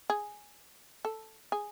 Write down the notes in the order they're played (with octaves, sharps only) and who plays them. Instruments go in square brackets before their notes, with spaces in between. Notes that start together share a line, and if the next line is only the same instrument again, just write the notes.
[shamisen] G#4
A4
G#4